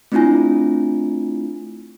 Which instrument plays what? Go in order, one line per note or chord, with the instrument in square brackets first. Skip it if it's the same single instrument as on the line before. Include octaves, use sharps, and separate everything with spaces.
[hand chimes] A3 C4 D4 E4 F4 G#5